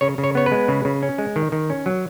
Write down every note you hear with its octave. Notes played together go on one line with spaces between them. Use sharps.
C#3 C#5
C#3
C#5
B3 C#5
B4
G#3
C#3
C#3
C#4
G#3
D#3
D#3
C#4
F#3